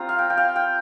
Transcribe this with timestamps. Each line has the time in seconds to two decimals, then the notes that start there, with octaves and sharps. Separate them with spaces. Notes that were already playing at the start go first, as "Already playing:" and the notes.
Already playing: G3 C4 F4 A#5
0.09 F5
0.19 G5
0.30 G5
0.37 F5
0.56 G5